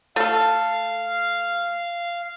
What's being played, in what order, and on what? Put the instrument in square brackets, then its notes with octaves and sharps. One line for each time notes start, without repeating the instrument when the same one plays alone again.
[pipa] A3 A4 [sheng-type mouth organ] F5